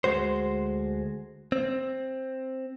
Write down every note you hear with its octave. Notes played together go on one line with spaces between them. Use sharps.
D2 G#3 F#4 C5
C4